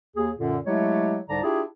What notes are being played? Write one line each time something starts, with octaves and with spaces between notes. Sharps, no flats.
D#2 G#4
F#2 A#2 D3
F#3 G#3 A3 E4 G4 C#5
C2 G#2 D3 D5 A5 A#5
D4 E4 F4 G4 G#4